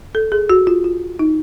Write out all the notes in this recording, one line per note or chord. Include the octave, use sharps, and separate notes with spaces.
A4
G#4
F#4
F4
F4
D#4